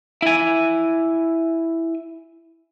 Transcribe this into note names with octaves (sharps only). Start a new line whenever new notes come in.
E4 G#5